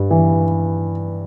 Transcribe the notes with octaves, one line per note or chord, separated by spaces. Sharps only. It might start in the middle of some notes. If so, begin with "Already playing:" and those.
Already playing: G2
E3